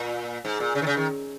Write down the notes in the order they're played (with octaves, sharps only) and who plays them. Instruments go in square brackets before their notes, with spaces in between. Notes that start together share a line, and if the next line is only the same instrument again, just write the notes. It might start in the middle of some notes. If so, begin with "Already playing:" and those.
Already playing: [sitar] A#2
G#2
A#2
C#3
D#3
C#3
D#3